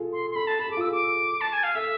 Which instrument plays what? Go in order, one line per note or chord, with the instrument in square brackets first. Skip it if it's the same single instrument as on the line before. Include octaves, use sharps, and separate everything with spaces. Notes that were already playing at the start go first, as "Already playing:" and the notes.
Already playing: [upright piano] F4 G#4 A4
[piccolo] C6
C6
[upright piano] A4 [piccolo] B5
[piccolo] A5
[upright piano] A4 [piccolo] B5
[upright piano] G#4 [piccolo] D6
[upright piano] F4
[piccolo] E6
[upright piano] G#4
[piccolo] D6
A5
G#5
F5
[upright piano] A4 [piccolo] E5